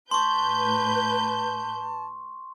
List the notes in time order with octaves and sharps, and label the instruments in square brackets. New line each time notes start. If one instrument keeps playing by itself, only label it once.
[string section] A2 B4 G6 [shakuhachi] A5 [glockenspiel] C6 C#6